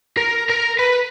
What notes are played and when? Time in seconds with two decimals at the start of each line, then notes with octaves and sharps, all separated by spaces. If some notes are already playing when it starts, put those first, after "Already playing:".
0.17 A#4
0.49 A#4 A#5
0.79 B4